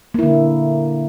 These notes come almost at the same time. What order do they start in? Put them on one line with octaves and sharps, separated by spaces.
A#3 E4 D3